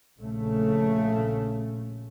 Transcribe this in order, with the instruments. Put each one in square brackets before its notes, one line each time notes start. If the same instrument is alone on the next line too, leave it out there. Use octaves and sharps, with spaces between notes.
[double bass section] A#1 C#3 A3